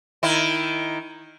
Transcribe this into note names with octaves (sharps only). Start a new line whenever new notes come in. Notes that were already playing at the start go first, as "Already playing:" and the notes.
D#3 E4